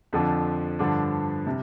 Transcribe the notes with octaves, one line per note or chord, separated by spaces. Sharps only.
F2 D3 F3 D4
G2 D3 F3 D4
C3 G3